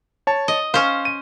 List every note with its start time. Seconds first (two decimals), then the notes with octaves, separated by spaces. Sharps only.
0.27 C#5 A5
0.48 D#5
0.74 C#4 C5 F5
1.05 D#7